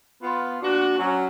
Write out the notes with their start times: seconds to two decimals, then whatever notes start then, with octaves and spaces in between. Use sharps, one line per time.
0.22 B3 F4
0.63 A#2 D4 F#4
0.98 F#3 C#4